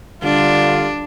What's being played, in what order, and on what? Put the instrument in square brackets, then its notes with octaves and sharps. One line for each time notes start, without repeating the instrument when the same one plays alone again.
[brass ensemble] D3 G3 F4 [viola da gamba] D4